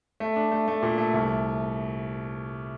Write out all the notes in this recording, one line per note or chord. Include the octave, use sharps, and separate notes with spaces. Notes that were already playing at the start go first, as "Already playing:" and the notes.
A3
D4
A3
A3
A#2
A3
C2